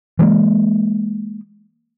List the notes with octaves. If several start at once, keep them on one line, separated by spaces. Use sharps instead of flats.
E3 G#3 A#3